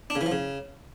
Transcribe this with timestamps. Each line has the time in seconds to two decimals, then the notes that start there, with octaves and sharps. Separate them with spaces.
0.10 D4
0.15 C#3
0.21 E3
0.26 F3
0.32 C#3